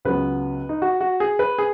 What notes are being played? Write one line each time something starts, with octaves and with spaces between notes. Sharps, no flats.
C#2 C#3 F#3 B3 B4
D#4
F#4
F#4
G#4
B4
G#4